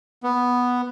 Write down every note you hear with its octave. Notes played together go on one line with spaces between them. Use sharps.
B3